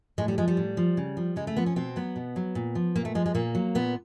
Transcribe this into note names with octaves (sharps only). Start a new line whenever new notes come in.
A2 G#3
G3
F3 G#3
G3
A2
F3
C#3
F3
C#3 G#3
A3
F3 B3
C#4
B2 C4
F#3 B3
B2
F#3
A#2
F3
A#2 A#3
A3
F3 G#3
G#3
A#2 A#3
F#3
A#2 B3